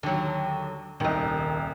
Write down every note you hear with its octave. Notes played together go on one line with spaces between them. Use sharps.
D#2 D3 F#3
D#1 C2 D#3 D#5